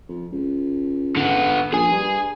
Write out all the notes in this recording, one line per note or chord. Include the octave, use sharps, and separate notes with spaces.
F2
C#2
D3 B3
A#1 G#4 G#5
G2